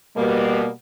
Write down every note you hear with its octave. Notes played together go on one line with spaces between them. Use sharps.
B2 G3 A#3